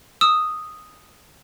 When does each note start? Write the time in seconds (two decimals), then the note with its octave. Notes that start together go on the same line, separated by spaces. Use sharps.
0.21 D#6 E6 E7